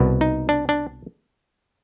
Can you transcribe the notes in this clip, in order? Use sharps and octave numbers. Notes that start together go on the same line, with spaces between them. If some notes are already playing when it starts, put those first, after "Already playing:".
Already playing: C2 B2 B3
D#4
D4
D4